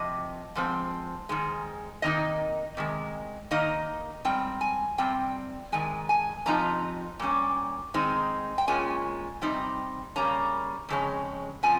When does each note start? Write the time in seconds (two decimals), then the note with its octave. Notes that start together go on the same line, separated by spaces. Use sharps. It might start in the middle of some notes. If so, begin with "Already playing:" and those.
Already playing: C3 F3 C4 D#5
0.55 G#2 F3 C4
1.29 G#2 D#3 G#3
2.02 C3 D#3 A#3 D#4 D#5
2.77 C3 D#3 G#3
3.51 D#3 A#3 D#4 D#5
4.25 G#2 G3 C4 G5
4.61 G#5
4.98 C3 G3 C4 G5
5.72 C3 D#3 G#3 G#5
6.09 G#5
6.46 F2 C3 F3 C4 D#4 A#5
7.19 A#2 G3 C#4
7.94 D#3 G#3 C4 D#4
8.58 G5
8.68 A#2 G#3 C#4 G#5
9.42 C3 G3 C4 D#4
10.16 C#3 G3 A#3 C#4 A#5
10.89 F2 C#3 G#3 C#4
11.63 C#3 F3 C4 G#5